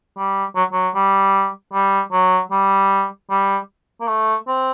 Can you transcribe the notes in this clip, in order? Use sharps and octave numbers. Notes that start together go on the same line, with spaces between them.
G3
F#3
F#3
G3
G3
F#3
G3
G3
A#3
A3
C4